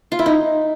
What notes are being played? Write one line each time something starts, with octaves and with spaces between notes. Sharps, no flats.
F4
E4
D#4